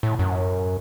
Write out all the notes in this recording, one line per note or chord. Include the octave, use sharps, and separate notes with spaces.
A2
F#2